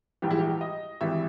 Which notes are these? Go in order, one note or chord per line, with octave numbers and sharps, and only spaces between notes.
A#1 G#2 E3 G3 G4
E4
G4
D#5
G#1 G2 E3 G3 E5